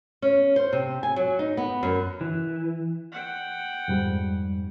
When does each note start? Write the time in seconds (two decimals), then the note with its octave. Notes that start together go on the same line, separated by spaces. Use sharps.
0.22 C#4
0.56 C5
0.73 C3
1.03 G#5
1.16 F#3
1.39 D#4
1.57 B3
1.83 F#2
2.21 E3
3.12 F#5 G5
3.88 F2 G#2 G3